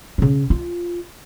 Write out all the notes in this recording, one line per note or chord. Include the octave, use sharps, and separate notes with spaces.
C#3 C#4
F4